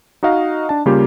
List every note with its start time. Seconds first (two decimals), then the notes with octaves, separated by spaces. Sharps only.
0.23 D#4 F#4 D#5 F5 A#5
0.69 D4 A5
0.86 C#3 G3 A#3 F4 G4